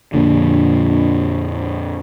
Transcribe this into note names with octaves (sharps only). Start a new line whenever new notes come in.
A#1 F2 A#2 D3